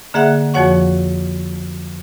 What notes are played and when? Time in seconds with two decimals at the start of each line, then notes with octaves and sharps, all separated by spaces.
0.14 D3 A#3 G#4 E5 F#5 F#6
0.54 F2 F3 F#4 C#5 F#5 C#6